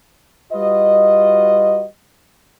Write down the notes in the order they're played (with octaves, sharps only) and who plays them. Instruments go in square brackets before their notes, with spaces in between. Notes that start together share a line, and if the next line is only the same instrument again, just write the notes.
[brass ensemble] G3 F4 F#4 B4 D#5